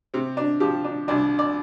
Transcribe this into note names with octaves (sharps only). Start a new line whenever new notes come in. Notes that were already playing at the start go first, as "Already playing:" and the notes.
C3 C4
D4
F3 G4
D4
C2 D4
D5